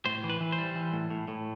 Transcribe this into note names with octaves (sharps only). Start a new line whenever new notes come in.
A2 C5
E3
B4
E3
C5
G3
E3
A2
A2
A2